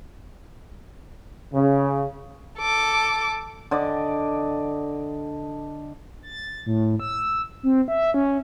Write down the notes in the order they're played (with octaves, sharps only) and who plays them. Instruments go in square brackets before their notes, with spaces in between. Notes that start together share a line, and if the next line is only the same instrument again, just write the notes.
[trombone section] C#3
[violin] A4 D6
[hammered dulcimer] D3 D5 D#5
[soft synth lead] A6
A2
E6
C4
E5
C#4